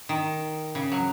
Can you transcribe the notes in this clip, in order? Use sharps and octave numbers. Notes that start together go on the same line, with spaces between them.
D#3
C#3
F#3